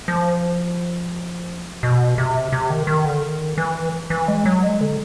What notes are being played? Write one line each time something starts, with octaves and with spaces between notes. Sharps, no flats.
F3
B2
C3
C3
D#3
D#3
D3
D#3
E3
E3
G#3
F#3
G#3
D3